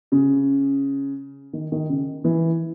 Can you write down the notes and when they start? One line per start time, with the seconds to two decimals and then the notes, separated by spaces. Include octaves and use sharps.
0.12 C#3
1.53 D#3
1.72 D#3
1.89 C#3
2.24 E3